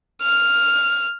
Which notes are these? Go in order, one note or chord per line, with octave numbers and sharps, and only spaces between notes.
F6